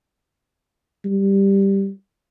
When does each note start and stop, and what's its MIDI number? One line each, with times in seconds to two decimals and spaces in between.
1.05 1.89 55